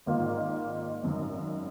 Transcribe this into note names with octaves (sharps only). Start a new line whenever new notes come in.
G#1 G#2 D#3 A#3 F4
G#1 F#2 D#3